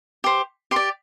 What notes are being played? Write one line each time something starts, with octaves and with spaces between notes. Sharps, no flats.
G4 C5
G4 C6
D5